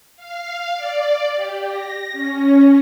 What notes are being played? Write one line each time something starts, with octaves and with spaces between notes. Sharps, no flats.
F5
D5
G4
A#6
C#4